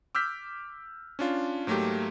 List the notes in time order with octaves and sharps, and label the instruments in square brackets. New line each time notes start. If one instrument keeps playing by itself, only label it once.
[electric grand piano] D6 E6 F6 G6 B6
C#4 D4 F4
G#2 F#3 A3 A#3 G4